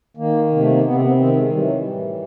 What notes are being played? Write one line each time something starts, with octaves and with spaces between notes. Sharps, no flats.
D#3 A#3
C3 A#3
A3
A#3
C3 B3
C4
B3
D#3 C4
G#3
E3 G3
F#3
G3
A2